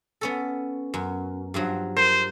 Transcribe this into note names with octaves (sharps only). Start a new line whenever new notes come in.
B3 C#4 A4
F#2
G2 F3 F#3
A#4 C5